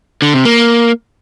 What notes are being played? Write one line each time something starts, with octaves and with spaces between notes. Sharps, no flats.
D3
C3
A#3